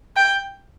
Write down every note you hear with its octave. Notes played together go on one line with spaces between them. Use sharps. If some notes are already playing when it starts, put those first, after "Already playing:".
G5